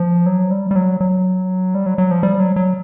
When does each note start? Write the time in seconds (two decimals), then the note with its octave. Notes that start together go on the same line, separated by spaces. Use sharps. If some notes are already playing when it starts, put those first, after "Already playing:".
Already playing: F3
0.26 F#3
0.51 G3
0.71 G3
0.76 F#3
1.00 F#3
1.75 G3
1.86 F#3
1.98 F#3
2.11 F3
2.23 G3
2.40 F#3
2.56 F#3